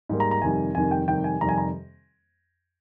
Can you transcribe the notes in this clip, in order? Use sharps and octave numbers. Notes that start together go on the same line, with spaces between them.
G#2 G3 A#3
A#5
A#5
F2 C3 D#3 G3 G#5
F2 C3 D#3 G3 G#5
G5
F2 C3 D#3 G3 G5
G#5
F2 C3 D#3 G3 A#5
G#5
A#5